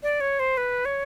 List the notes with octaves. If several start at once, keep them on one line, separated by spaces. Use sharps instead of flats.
D5
C#5
C5
B4
C#5